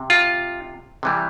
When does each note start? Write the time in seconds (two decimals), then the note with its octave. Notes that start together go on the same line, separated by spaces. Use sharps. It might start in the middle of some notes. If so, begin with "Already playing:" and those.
Already playing: C3
0.10 F4
1.03 C3 E3 G3